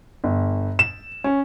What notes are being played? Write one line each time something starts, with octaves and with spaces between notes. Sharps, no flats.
G1
E7
C#4